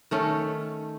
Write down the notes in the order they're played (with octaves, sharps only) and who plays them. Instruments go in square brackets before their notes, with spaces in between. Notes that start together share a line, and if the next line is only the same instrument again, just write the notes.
[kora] D#3 A3 C#4